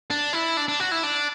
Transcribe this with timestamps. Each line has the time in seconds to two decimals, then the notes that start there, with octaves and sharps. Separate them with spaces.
0.11 D4
0.33 E4
0.57 D4
0.68 D4
0.80 F#4
0.91 E4
1.03 D4